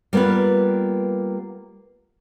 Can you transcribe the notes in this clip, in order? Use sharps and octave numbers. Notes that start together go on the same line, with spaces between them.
G3 A#3 B3 F4 B4